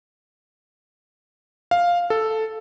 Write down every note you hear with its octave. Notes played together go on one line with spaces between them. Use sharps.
F5
A4